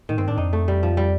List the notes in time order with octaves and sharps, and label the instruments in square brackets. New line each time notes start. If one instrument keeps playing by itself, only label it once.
[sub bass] A2 [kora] D#3
[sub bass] G2 [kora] C4
[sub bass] A2 [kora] D4
[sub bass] F2 [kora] D#4
[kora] A3
G3
F3
G3